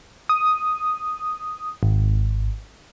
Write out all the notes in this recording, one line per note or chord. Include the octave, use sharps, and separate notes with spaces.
D#6
G#1